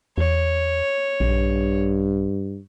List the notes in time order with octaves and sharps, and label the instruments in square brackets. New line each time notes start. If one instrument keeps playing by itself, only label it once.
[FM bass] E2 [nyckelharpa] C#5
[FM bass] A#1 [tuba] G2